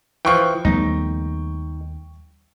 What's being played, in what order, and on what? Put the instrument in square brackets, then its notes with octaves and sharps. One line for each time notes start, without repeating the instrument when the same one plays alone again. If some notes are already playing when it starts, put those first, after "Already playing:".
[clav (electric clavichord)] E3 F3 [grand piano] G5 C#6
[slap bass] D#2 A3 B3 [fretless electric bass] F3 G3 [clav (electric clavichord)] D#4